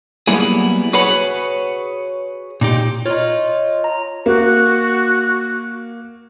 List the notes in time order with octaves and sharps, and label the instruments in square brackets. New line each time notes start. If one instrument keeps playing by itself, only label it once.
[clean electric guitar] F#3 G3 A#3 B3 E4 G#4
F#4 G#4 B4 C#5 F#5 B5
A#2 D#4 G4
[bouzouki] D#4 F4 [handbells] C#5
[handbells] A#5
[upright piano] A#3 [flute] F#4